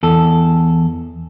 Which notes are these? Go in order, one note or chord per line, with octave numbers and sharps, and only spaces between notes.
E2 A4